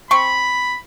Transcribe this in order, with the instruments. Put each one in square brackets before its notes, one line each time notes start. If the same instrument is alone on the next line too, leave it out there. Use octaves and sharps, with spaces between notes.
[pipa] C4 C#6 [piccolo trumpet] B5